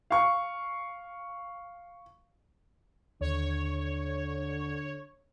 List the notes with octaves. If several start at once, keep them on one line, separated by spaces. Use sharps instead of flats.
F5 C#6
D#2 D3 C#5